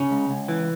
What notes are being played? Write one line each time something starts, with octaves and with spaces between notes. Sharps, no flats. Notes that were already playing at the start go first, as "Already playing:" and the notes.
Already playing: C#3 C#4
C#2
C#2
E3